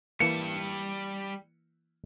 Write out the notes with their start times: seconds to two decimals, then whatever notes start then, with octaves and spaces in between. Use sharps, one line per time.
0.20 E3 G3 A#3 A5 C#7